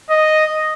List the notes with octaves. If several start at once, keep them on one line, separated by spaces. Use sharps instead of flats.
D#5